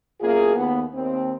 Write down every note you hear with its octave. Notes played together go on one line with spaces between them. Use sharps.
F#2 B2 A#3 F4 G#4
D#2 B3
D#2 C4